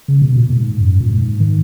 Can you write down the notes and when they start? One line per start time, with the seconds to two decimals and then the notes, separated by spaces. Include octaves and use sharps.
0.08 C#3
0.22 B2
0.36 A#2
0.50 G#2
0.80 F#2
1.00 A#2
1.10 G#2
1.40 D#3